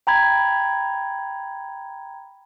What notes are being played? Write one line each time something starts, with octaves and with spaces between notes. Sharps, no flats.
G5 A#5 B5 G#6